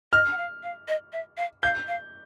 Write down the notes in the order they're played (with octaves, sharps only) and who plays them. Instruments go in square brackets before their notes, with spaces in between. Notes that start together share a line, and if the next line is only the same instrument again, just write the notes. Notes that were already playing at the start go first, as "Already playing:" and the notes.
[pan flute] D#5 [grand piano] F6
[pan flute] F#5
F5
F5
D#5
E5
F5
[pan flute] F5 [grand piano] G6
[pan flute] F5